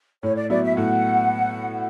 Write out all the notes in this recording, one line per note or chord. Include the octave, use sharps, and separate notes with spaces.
A2 C#5
D5
F#3 B3 E4 D5
E5
A2 F#5